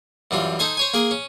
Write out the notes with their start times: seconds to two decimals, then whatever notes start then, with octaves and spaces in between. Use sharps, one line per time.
0.31 F#2 E3 G3 F4
0.59 D#4 A4 C5 G#5 C6
0.77 C5 C#5 G#5
0.94 A#3 G#4 A#4
1.11 C#4